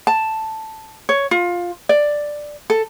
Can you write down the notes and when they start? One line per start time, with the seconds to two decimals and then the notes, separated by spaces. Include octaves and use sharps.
0.07 A5
1.09 C#5
1.31 F4
1.89 D5
2.70 A4